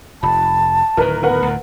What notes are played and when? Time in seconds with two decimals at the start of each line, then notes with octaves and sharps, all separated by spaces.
0.23 F1 A5 B5
0.97 D1 D#3 A#4 B4
1.23 B3 A#4 B4 F#5
1.42 D2 A2